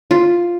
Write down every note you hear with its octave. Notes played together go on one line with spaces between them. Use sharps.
F4